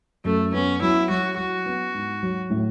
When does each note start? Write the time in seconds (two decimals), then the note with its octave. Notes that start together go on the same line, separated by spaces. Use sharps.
0.25 F#2 A3
0.54 B3 C#4
0.82 F#3 E4
1.10 F#3 F#4
1.37 F#3 F#4
1.66 B3
1.94 G#2
2.23 F#3
2.50 A2